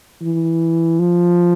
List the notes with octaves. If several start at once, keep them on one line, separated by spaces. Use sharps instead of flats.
E3
F3